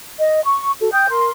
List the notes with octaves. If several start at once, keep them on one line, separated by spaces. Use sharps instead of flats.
D#5
C#6
F#4 A4
G5 D#6 G6
A#4 C6